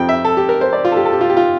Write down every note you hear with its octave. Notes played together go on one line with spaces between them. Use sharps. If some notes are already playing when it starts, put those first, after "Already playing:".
Already playing: F2 C3 F3 C4 F4 G5
E5
A4
G4
A#4
C5
D5
F4
A4
G4
A4
G4
F4
G4
F4